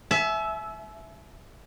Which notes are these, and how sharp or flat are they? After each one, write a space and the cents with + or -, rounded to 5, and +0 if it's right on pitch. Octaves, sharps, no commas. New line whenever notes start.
E5 +0 G#5 +45